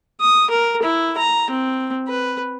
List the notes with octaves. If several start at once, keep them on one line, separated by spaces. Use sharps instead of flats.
D#6
A#4
E4
A#5
C4
B4